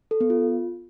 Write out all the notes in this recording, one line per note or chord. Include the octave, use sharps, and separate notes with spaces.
A4
B3
F4